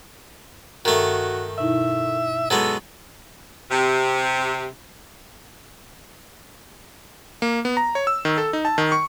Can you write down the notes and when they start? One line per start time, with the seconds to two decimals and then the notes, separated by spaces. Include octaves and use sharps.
0.85 G2 D#3 A3 F#4
1.58 B2 D#4 E4 E5
2.50 F#3 G#3 B3 A4
3.71 C3
7.42 A#3
7.65 B3
7.77 A#5
7.95 C#5
8.07 E6
8.25 D#3
8.38 A4
8.53 D#4
8.65 A5
8.78 D#3
8.92 C#6